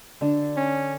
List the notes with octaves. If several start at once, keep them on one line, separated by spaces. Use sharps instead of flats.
D3 D4
C#4